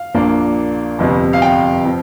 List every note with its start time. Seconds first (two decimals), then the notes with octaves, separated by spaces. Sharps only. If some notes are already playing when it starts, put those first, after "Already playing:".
Already playing: F5
0.14 A#1 A#2 A#3 D4
0.99 G1 F2 C3
1.33 F5
1.42 G5
1.85 F3 C4